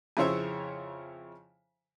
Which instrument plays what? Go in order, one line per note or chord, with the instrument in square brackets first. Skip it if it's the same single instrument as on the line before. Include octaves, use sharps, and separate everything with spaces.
[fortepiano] F2 C#3 E4 C5 C#5 E5